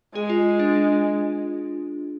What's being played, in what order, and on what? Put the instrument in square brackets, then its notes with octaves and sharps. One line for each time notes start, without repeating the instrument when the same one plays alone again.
[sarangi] G#3 [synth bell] G#4
[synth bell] F4
D4